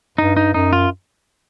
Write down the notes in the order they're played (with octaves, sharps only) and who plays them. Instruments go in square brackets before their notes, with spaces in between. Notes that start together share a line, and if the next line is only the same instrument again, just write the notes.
[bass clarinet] G2 [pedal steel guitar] D#4
[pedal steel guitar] D#4
[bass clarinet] F#2 [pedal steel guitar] D#4
[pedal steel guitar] F4